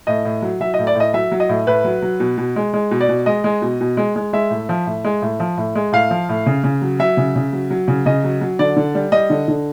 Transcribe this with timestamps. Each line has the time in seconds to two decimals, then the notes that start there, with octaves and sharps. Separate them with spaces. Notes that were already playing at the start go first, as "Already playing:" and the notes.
0.07 A2 D#5
0.25 A2
0.42 F#3
0.60 F#3 E5
0.74 D#5
0.79 A2
0.87 D5
0.95 A2 D#5
1.13 F#3 E5
1.32 F#3
1.40 D#5
1.49 A2
1.67 A2 B4
1.84 F#3
2.02 F#3
2.20 B2
2.38 B2
2.56 G#3
2.73 G#3
2.91 B2
3.01 D5
3.09 B2
3.26 G#3 D#5
3.44 G#3
3.62 B2
3.81 B2
3.97 G#3
4.16 G#3
4.33 G#3 E5
4.51 A2
4.69 F3
4.86 A2
5.04 G#3
5.22 A2
5.40 F3
5.58 A2
5.75 G#3
5.92 A2 F5
6.11 F3
6.29 A2
6.46 C#3
6.64 C#3
6.82 F#3
6.99 F#3 E5
7.17 C#3
7.36 C#3
7.53 F#3
7.70 F#3
7.88 C#3
8.06 C#3 D#5
8.24 F#3
8.41 F#3
8.59 D3 D5
8.77 D3
8.95 G3
9.12 G3 D#5
9.30 D3
9.48 D3